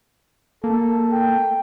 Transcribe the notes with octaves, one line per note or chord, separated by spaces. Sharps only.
A#3 A4
G5